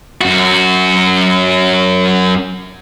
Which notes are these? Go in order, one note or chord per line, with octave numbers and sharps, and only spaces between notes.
F#2 F#4